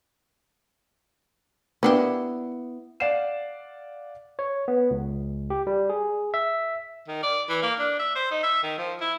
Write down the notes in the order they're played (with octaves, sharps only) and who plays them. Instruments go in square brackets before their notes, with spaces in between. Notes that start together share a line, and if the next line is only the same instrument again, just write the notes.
[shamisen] A#3 D4 G4 [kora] B3 E4
[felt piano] D5 F5 F#5 C7 E7
[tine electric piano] C#5
B3
C#2
G4
G3
G#4
E5
[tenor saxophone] D#3
D5
E3
A#3
D4
E5
C5
D#4
E5
D#3
F3
E4